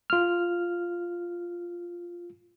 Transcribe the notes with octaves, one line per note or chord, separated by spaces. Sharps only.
F4 F6